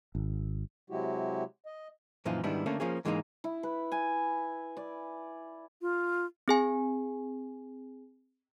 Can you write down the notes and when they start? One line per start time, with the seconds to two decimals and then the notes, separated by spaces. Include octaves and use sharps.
0.15 G#1
0.90 C3 F#3 G#3 E4 F#4 G4
1.66 D#5
2.25 F#2 A#2 E3 F3 D#4 F4
2.44 G#2 D#3 G3 B3 D4 E4
2.66 D3 A3 A#3 C#4 D4
2.80 F3 A#3 C#4 G#4
3.05 G#2 E3 G#3 A#3 D4 D#4
3.44 E4
3.63 B4
3.92 G#5
4.77 D5
5.82 F4
6.48 C4 G#4 G#5